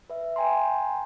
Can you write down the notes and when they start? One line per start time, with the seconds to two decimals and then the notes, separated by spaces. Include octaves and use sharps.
0.10 B4 E5
0.36 G5 G#5 A#5 C6